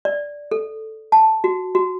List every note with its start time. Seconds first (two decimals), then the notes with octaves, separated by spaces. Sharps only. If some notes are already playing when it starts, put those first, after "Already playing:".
0.05 D5
0.51 A4
1.12 A5
1.44 F#4
1.75 F#4